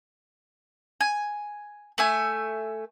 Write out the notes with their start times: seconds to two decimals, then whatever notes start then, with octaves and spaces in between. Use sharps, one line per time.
1.01 G#5
1.98 A3 E5 G#5